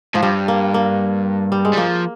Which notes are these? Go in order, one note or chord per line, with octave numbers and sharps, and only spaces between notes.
G#2 F3
G2 G3
A#3
A#3
G3
G#3
G3
F3 A#3